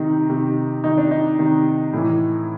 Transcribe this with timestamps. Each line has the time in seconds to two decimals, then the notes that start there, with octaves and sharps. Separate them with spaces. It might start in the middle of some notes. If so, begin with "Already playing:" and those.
Already playing: C3 D#3 D#4
0.29 C3 D#3
0.84 C3 D#3 D#4
0.98 D4
1.11 D#4
1.39 C3 D#3
1.93 A2 E3